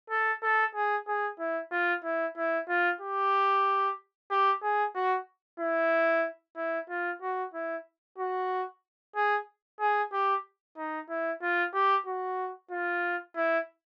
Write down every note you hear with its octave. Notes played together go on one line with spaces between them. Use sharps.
A4
A4
G#4
G#4
E4
F4
E4
E4
F4
G4
G4
G#4
F#4
E4
E4
F4
F#4
E4
F#4
G#4
G#4
G4
D#4
E4
F4
G4
F#4
F4
E4